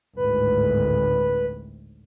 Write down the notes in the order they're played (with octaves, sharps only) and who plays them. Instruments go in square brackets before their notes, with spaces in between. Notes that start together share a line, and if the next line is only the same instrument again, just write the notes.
[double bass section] G#1 D2 A2 [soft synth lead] B4